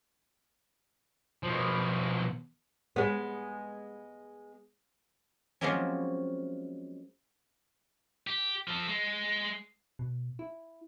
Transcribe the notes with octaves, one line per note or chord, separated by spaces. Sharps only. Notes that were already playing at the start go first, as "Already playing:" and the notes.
B2 F3
G#3 B3
F3 F#3 G#3 A#3 C4 C#4
G4
F3 A4
G#3
B2
E4